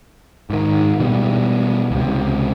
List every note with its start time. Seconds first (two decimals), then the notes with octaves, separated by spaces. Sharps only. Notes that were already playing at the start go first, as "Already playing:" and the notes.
0.50 G#2 D#3
1.00 B2 E3 G3
1.91 C#2 C3